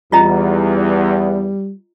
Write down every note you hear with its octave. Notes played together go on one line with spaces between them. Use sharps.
E2 G3 F4 D#5 A#5